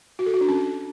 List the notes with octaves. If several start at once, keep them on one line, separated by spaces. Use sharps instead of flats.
F#4
A4
F#4
D4
C#4